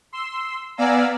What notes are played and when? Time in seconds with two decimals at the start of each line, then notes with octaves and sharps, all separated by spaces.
0.13 C6 E6
0.77 B3 D5 F5 G#5 A#5 E6